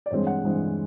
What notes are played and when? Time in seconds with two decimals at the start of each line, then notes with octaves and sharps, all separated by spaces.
0.06 D5
0.11 G2 E3 G#3 C4 C#5
0.27 F#5
0.43 G2 E3 G#3 C4